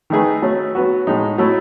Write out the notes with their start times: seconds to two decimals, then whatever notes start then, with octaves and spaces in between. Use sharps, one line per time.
0.10 D#3 A3 D#4 G#4 B4
0.42 F#3 A3 C#4
0.75 F#3 B3 F#4
1.07 A2 G#3 D#4
1.38 F#3 A3 E4